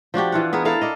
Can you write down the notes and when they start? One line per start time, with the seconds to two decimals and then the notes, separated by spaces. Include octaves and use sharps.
0.14 F3 D4 F#4 G4
0.32 E3 F4 F#5
0.53 B3 G#4 A#4
0.65 E4 A4 A#4 F5
0.81 A4 D5 D#5